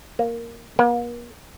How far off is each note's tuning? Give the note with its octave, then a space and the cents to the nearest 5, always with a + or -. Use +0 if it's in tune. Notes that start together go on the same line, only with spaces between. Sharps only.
A#3 +0
A#3 +45